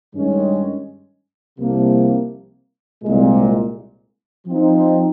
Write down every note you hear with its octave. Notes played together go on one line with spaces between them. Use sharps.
G2 D#3 G#3 C#4
C2 C3 F3 A#3
C2 A#2 G#3
F3 C4 D#4